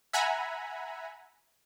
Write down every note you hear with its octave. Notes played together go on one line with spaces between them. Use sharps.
E5 F#5 G#5 A#5 B5